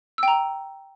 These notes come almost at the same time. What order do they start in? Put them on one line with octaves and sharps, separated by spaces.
E6 G5 A#5